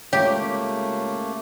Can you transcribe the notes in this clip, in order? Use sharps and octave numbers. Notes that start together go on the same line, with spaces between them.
C#2 A3 A#3 G4 C#5